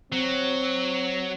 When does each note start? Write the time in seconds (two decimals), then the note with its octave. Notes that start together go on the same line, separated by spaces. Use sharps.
0.12 F#3 C4